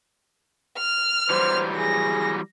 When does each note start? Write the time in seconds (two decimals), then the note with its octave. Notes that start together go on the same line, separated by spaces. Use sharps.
0.78 F6
1.30 E3 F#3 G3 C5
1.77 G#4 A#6